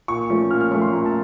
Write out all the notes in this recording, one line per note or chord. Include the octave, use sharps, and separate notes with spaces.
A#2 C#6
F3 A3 C#4
A#2 F6
F6
F3 A3 C#4 C#6
C6
A#2 A#5
A5